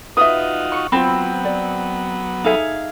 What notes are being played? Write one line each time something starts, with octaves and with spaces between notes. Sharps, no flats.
D#4 F4 F#4 B4 E5 D#6
C#6
F#3 B3 C4 F4 C5 B5
D5
D#4 G#4 A4 E5 F5